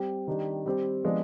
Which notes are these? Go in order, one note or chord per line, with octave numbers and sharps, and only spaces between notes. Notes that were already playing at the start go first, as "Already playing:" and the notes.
Already playing: G3 C4 G4
D#3 G3 D4 G4
G3 C4 G4
F3 G#3 B3 D4 F4